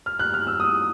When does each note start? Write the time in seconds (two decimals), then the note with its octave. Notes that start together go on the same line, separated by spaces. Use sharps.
0.06 F6
0.19 F#6
0.34 F6
0.47 E6
0.60 D#6